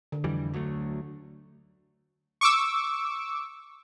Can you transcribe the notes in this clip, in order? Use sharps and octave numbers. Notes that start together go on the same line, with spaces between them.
D3
F2 E3 G3
D2 F#3 A3
C#6 D6 E6